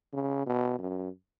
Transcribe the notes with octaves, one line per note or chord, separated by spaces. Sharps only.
C#3
B2
F#2